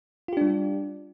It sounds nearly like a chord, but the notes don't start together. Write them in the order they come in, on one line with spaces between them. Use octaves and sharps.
F4 G4 D4 G3